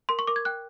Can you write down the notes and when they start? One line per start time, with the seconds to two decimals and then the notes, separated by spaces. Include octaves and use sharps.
0.09 A#4 C6
0.19 C#6
0.27 A#4 D6
0.36 G#6
0.45 G5 F#6